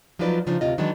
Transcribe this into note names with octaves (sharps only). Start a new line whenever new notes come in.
F3 F#3 D#4 F4 B4 D5
C#3 F3 D4 D#4 F4
D2 C3 F4 D#5
D#3 E3 F#3 G#3 D4